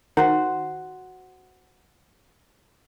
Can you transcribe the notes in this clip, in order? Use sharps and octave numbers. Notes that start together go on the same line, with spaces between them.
D#3 F#4 C5